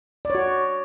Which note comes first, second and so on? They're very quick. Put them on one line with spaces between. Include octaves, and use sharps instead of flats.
D5 C#5 F#4